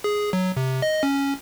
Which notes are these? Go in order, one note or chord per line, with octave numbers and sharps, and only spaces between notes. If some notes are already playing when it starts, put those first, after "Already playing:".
G#4
F#3
C3
D#5
C#4